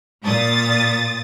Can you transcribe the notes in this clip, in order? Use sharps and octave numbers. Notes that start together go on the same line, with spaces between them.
A#2 D#6 A6